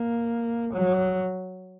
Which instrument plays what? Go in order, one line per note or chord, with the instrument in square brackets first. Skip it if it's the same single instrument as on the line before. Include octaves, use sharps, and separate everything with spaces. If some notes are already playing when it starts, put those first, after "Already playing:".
Already playing: [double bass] A#3
F#3